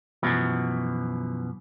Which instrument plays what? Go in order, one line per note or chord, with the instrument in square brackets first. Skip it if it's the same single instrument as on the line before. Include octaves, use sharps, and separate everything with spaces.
[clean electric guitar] F#2 B2 E3 F3